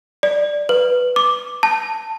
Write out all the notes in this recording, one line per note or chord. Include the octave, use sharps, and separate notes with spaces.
D5
B4
D6
A5